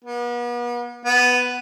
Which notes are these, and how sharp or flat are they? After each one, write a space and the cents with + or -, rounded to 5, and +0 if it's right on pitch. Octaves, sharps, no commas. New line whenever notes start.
B3 -40
B3 +5